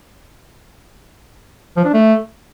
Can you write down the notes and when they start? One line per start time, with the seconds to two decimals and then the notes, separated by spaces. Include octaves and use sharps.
1.77 F3
1.85 D4
1.93 A3